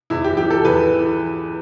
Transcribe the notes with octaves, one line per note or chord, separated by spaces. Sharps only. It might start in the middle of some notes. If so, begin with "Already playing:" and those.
E2 E4
G4
E3 G4
A4
E2 B4
E3